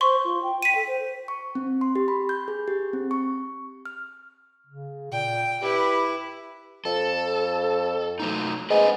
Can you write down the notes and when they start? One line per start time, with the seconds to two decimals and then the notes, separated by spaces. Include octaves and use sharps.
0.01 C5 C6 C#6
0.25 F4
0.43 G5
0.62 B6 D#7
0.75 A4
0.87 C5
1.28 C#6
1.55 C4
1.81 C6
1.96 G4
2.08 B5
2.29 G6
2.48 G#4
2.68 G4
2.93 C4
3.11 C#6
3.85 F6
4.67 C#3
5.12 A#2 G5
5.62 E4 G4 B4
6.85 F2 A4
8.20 F#3 A3 D#4
8.70 G#3 B4 C5 F#5